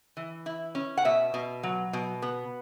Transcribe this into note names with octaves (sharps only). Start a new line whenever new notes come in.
E3
E4
C#4
F#5
B2 E5
B2
F#3
B2
B3